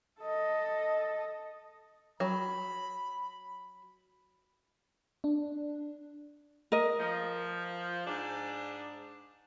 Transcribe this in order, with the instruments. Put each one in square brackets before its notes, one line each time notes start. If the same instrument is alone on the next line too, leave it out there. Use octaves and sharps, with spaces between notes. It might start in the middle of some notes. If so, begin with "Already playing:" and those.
[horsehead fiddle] A4 D#5
[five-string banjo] F#3 [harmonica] B5
[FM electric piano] D4
[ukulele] A#4 D#5
[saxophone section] F3
G#2 D4